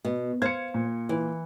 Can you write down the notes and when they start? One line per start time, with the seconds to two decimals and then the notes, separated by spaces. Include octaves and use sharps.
0.05 B2
0.42 C5 F5 G#6 C#7
0.74 A#2
1.09 E3